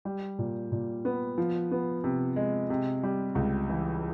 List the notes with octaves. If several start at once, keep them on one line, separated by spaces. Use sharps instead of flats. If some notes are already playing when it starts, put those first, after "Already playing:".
G3
A#2
A#2
B3
F3
B3
C3
G#3
C3
G3
C#2
E3